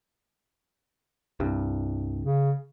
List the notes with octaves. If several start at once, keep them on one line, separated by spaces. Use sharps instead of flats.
C2 G2
C#3